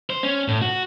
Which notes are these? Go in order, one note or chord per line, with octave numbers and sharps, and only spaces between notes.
C5
C#4
A2
F#4